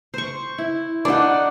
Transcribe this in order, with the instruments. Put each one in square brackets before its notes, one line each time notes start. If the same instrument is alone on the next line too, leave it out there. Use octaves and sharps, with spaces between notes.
[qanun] C5 C#6
E4
[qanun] D4 D#4 [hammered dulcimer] D5 F#5